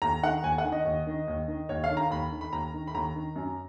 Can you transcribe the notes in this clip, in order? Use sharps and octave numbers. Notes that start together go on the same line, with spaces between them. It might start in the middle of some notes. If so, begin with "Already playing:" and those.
D#2 A#5
D#3 F#5
D#2 G#5
F#5
D#3
D#5
D#2
D#3
D#2
D#3
D#2 C#5
F5
D#3
A#5
D#2 B5
D#3
B5
D#2 A#5
D#3
B5
D#2 A#5
D#3
F#2